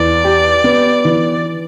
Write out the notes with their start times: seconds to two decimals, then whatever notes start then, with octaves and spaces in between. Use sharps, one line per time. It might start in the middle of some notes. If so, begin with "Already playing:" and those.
Already playing: E2 D5
0.24 G4
0.64 B3
1.05 E3